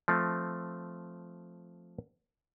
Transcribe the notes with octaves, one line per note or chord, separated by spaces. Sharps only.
F3 A3 C4